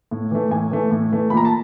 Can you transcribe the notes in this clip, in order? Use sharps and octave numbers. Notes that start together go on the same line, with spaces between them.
A2
E3 A3
A2 G#5
E3 A3
A2
E3 A3
A#2 B5
A#5
A5